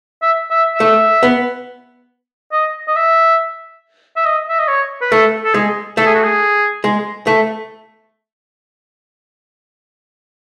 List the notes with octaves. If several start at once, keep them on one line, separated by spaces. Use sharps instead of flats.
E5
E5
A3 E5
B3
D#5
D#5
E5
E5
D#5
E5
D#5
C#5
B4
A3 A4
A4
G#3 G#4
A3 A4
G#4
F#4
G#4
G#3
A3